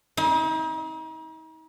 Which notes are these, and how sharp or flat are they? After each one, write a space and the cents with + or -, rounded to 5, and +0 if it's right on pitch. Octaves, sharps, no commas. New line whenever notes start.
D#4 +40